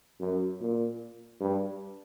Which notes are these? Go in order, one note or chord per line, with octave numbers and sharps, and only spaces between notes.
F#2
A#2
G2